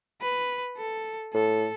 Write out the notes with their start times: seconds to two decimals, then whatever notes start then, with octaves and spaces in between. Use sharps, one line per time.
0.21 B4
0.77 A4
1.34 A2 A4